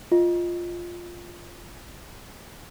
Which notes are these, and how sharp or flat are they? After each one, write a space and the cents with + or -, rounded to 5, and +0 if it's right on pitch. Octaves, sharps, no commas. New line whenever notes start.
F4 +0 D#5 +0